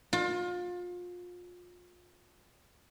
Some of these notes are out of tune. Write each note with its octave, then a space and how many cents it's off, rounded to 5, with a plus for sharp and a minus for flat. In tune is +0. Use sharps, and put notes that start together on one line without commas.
F4 +30